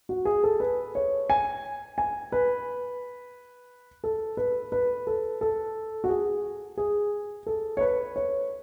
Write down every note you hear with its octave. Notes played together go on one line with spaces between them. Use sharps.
F#4
G#4
A4
B4
C#5
G#5
G#5
B4
A4
B4
B4
A4
A4
F#4
G#4
G#4
A4
C#5
B4
C#5